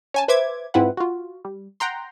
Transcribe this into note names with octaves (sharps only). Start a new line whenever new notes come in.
C#4 G#5 A5
B4 C5 E5 D6 G#6
G#2 C4 E4 F4 B4 F#5
F4 F#4
G3
F#5 G5 A#5 C6